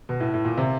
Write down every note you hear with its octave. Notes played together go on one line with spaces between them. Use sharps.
B2
A2
A2
A#2
C3